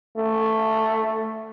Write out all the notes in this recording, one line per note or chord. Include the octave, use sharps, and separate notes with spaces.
A3